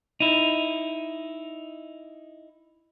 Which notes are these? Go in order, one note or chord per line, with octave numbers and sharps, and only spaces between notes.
D#4 E4